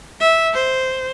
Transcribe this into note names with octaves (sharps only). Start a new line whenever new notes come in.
E5
C5